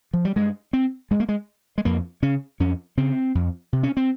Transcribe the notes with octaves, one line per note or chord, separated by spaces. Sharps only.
F3
G3
G2 G#3
C4
G2 G#3
A#3
G#3
G#3
F2 A#3
C#3 C#4
F2 C#4
C#3 C4
F2
C3
C#4
C4